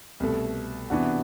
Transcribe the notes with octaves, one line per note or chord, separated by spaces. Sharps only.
C2 B2 A3
C3 E3 B3 D4 F#4